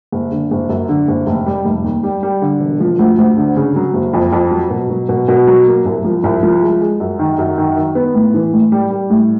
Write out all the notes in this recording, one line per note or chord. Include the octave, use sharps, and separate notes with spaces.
F#1
D3
F#1
F#2
D3
F#1
F1
G3
F1
D#2
G3
G3
D3
E1
F3
D2
D2
D3
C#3
F#3
F#1
F2
F2
F#3
B2
F#3
B2
B2
F#3
A#3
C2
F3
C2
F3
G#3
G#3
F#2
D#3
F#2
D#3
D#3
B3
A2
E3
A2
G3
G3
A2